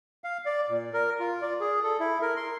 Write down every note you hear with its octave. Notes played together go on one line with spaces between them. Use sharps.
F5
D5
A#2
A#4
F4
D5
G#4
A4
E4
A#4
C6